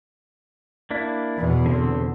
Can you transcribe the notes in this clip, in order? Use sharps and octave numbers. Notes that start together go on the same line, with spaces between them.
A#3 D4 E4
E2 B2
D3 C4